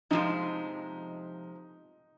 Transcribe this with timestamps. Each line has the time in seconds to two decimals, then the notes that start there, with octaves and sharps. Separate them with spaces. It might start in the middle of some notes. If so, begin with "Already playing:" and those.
0.11 F2 C3 F3 G#3 D#4